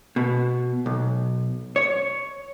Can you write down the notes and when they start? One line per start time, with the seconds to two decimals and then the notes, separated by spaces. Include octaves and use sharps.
0.16 B2
0.86 B1
1.76 C#5